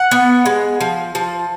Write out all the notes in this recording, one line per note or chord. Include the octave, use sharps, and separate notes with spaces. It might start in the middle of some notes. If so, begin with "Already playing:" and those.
Already playing: F#5
B3
G#3
F3
F3